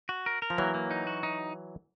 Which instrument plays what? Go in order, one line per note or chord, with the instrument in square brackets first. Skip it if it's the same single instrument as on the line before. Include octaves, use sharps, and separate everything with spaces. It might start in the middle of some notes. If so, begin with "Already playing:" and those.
[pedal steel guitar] F#4
A#4
A#4
[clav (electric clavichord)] F3
[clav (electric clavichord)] E3 F#3 [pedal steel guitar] A#3
[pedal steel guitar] A#3
D#4
F#4
D#4